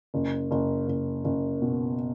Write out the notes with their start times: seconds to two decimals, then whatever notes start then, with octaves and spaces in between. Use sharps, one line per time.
0.14 F#1
0.51 F#1
0.88 F#1
1.24 F#1
1.62 B2